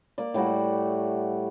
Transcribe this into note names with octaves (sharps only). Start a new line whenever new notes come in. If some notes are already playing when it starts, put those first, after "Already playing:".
A#3 D5
A2 G3 A3 F#4